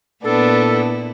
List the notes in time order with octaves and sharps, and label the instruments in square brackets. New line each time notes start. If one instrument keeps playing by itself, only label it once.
[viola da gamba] A#2 E4 [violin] B3 D4 [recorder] A4